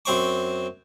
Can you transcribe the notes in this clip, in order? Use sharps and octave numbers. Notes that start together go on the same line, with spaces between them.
F#2 C4 C5 C#6 D6